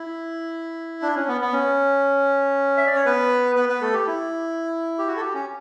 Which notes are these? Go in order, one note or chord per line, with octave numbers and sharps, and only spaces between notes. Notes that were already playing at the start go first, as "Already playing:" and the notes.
Already playing: E4
D4
C#4
B3
B3
C#4
E5
D5
C#5
B3 B4
B3 B4
B3 B4
A3 A4
G4
E4
G4
F#4
A4
G4
C#4